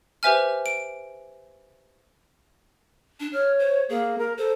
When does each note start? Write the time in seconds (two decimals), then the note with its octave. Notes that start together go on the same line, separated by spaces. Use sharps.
0.23 G4 B4 C5 E5 G#5 F6
0.66 D7
3.20 D4
3.33 C#5 F6
3.59 C5
3.89 A#3 G#4
4.18 A#4
4.38 A4 C5